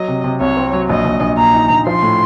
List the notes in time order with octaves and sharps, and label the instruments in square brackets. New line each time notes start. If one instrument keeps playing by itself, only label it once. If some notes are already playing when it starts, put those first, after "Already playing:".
Already playing: [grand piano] F#3 [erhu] D#5
[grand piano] C3
C3
[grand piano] C2 [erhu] C#5
[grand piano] C4
F#3
[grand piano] A#1 [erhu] D#5
[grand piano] A#1
A#1
[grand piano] A#2 [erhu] A#5
[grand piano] D#4
A#1
[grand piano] F3 [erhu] C6
[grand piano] A2